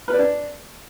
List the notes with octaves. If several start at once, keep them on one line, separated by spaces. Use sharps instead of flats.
B4
D5
D4